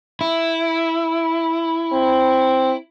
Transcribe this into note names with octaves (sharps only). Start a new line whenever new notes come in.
E4
C4